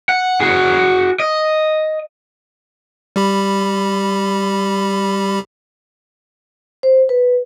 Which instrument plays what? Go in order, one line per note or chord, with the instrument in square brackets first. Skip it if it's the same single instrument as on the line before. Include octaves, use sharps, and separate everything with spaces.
[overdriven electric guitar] F#5
F#4 G#4
D#5
[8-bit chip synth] G3 G4 B5
[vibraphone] C5
B4